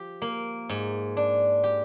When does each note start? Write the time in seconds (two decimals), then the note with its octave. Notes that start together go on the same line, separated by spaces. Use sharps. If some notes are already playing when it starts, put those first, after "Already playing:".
Already playing: F3 G4
0.22 A#3
0.69 G#2
1.17 D4
1.64 G4